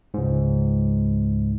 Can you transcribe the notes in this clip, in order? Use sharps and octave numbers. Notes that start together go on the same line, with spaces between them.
C#2 G#2